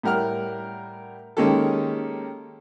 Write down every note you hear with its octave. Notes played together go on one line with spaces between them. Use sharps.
A2 G3 A#4 F#5 F6
D#3 G#3 A#3 C#4 G4 A4